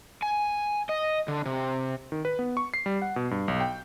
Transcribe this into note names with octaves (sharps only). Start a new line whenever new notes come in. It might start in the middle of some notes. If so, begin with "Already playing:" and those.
G#5
D#5
D3
C3
D#3
B4
B3
C#6
C7
G3
F#5
B2
G2
B1
G5